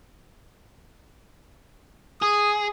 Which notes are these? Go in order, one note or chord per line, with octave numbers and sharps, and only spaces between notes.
G#4 D#6